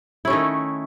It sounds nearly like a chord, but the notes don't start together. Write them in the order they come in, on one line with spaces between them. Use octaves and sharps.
E4 C#4 A3 D#3